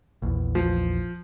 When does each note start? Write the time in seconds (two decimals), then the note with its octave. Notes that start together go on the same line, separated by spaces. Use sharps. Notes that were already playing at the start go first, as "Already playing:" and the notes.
0.22 A#1 E2
0.55 F3